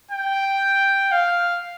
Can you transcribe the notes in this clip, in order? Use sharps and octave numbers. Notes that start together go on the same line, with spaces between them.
G5
F5